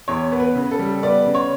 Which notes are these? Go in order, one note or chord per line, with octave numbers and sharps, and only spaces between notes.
E2 C#5
B3
B4
C#3
A4
G3
B3 D5
C#3
C#5